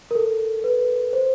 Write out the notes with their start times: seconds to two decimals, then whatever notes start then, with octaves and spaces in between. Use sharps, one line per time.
0.11 A#4
0.15 A4
0.64 B4
1.13 C5